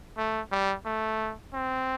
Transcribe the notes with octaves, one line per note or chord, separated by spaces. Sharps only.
A3
G3
A3
C4